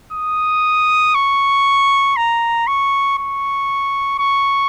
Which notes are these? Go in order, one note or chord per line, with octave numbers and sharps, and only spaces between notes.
D#6
C#6
A#5
C#6
C#6
C#6